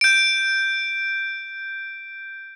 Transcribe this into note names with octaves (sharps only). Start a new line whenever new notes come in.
G6 D7